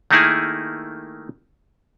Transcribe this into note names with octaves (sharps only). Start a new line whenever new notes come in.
D#3 A3 A#3 D#4 E4 G#4